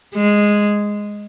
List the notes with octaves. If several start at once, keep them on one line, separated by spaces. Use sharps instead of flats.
G#3